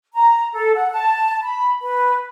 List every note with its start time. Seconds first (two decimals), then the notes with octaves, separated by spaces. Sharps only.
0.14 A#5
0.54 A4
0.75 F#5
0.92 A5
1.43 B5
1.83 B4